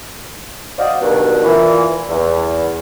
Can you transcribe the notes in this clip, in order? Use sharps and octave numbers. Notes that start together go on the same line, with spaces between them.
F#4 C5 D5 D#5 F5
G2 B2 D3 D#3 F#3
A#2 E3
E2